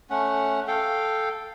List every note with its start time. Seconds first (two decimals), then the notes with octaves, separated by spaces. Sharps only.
0.10 A3 C#4 F#5
0.68 A4 F5 G5